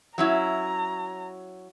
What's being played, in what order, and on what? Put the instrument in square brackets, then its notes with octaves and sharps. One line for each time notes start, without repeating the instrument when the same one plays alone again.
[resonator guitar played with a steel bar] F#3 C#4 E4 [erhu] A#5